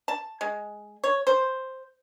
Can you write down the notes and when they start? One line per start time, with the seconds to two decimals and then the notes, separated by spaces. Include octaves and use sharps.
0.08 A5
0.41 G#3
1.04 C#5
1.27 C5